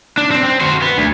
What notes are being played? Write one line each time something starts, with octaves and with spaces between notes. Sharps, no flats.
D4
C4
C4
F#4 C5
B3
D2